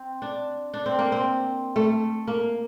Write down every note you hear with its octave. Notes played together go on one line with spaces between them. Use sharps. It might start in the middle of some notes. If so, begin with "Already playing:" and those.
Already playing: C4
D4
D4
C4
A#3
C4
A3
A#3